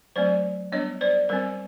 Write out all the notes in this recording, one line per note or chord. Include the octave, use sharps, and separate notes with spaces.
F#3 A3 C4 C5 D5
G3 B3 D4 C#5 D#5
C5 D5
G3 C4 A#4 C5